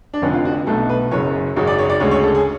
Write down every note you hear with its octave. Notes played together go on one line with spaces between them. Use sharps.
D4
F1 F2 D3 C#4
F4
F#4
B1 B2 A3 A4
B4
F#1 F#2 C#3 C#5
G#1 F#2 C#3 F#3 C#5
D5
C#5
D5
D2 C#3 G#3 C#5
C#5
A4
G#4